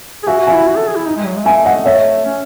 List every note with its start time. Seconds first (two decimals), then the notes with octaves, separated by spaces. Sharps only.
0.23 G#4
0.27 F#4 E5 G#5
0.40 F#4
0.47 E5 G#5
0.53 E4
0.67 F#4
0.77 A4
0.87 G#4
0.96 E4
1.06 D#4
1.16 G#3
1.25 F#3
1.36 G#3
1.46 A3 E5 G#5
1.65 D#5 F#5
1.86 C#5 E5
2.25 C#4